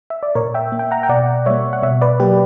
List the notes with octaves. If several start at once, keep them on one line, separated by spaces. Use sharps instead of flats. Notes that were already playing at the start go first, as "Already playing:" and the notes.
E5
D5
A#2 A#4 C#5
E5 G5
A#3
G5
F#5 A#5
G5
B2 D5 F#5
G3 A#3 C#5 E5
F#5
B2 C#5 E5
B4 D5
F#3 A#3 G4 B4